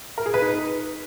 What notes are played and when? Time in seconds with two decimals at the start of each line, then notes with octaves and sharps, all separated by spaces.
0.18 A#4
0.26 G#4
0.34 B4
0.42 D#4